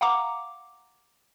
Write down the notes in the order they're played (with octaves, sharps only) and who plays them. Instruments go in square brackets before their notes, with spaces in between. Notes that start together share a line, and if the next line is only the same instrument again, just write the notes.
[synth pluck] F5 F#5 A#5 D6